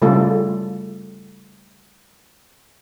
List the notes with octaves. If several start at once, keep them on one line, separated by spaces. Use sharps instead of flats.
C#3 G3 A3 F4 A4